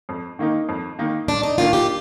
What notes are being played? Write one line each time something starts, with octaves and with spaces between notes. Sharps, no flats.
F2
D#3 A#3 D#4
F2
D#3 A#3 D#4
G2 D4
D#4
D#3 A#3 D4 F4
G4